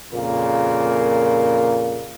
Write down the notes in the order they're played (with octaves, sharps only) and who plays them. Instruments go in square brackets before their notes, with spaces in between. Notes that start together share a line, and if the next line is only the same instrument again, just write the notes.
[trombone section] F2 A#2 C#3 A#3